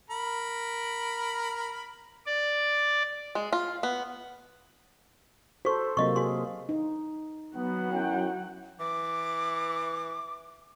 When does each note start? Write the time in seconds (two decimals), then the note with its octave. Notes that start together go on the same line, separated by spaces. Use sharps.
0.10 A#4 B5
2.26 D5
3.35 G#3
3.53 F4
3.83 B3
5.65 F#4 A4 C5 C#6
5.97 C3 F#3 A#3 F4 D#5 C#6
6.16 F#4 G#4 C6
6.69 D#4
7.56 F#3 B3 F#5
7.91 F#2 E4 G5
8.80 E3 D6